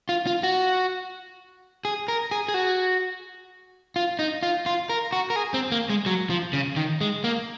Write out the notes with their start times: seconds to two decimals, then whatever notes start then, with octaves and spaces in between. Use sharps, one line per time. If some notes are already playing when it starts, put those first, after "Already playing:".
0.09 F4
0.27 F4
0.43 F#4
1.85 G#4
2.08 A#4
2.31 G#4
2.48 G#4
2.54 F#4
3.96 F4
4.19 D#4
4.43 F4
4.66 F4
4.89 A#4
5.13 F#4
5.30 A#4
5.36 G#4
5.54 C4
5.72 A#3
5.90 G#3
6.06 F#3
6.30 F3
6.53 C#3
6.76 D#3
7.01 G#3
7.24 A#3